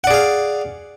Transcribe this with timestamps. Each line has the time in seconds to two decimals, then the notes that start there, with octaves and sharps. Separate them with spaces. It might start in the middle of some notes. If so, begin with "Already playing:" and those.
0.04 F#5
0.07 D5
0.10 G#4
0.14 F5